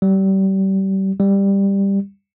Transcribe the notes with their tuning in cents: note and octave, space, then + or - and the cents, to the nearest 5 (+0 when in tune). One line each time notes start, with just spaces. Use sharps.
G3 -30
G3 +10